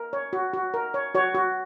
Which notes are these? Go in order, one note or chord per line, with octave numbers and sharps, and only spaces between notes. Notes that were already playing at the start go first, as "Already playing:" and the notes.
Already playing: A#4
C#5
F#4
F#4
A#4
C#5
F#4 C#5
F#4